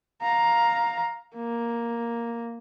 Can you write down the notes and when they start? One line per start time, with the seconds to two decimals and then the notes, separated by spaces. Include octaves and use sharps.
0.22 F5 A#5
1.35 A#3